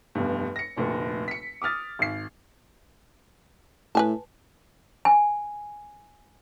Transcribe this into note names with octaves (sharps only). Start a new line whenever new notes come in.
F1 E2 G2
A#6 C#7
F1 D2 A#2
B6 C#7
D6 D#6 F6 A6
G#1 C7
A2 B4 G#5 A5
G#5